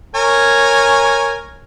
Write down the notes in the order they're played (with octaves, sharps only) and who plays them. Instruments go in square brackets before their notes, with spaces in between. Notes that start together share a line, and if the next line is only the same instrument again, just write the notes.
[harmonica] A#4 C#5 G#5